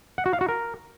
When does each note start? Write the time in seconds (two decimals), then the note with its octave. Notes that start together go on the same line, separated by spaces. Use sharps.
0.18 F#5
0.26 F#4
0.33 F5
0.41 F#4
0.48 A#4